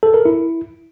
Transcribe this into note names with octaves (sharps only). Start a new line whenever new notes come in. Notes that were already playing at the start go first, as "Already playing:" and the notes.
A4
A#4
E4